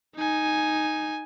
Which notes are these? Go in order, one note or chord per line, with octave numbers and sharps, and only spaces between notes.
D#4 G#5